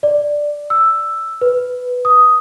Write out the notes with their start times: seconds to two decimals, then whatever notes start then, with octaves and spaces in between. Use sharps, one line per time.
0.03 D5
0.70 E6
1.41 B4
2.05 D#6